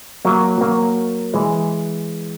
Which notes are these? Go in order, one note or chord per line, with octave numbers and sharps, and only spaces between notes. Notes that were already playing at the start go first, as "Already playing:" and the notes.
F#3 A#3
F#3 A#3
E3 G#3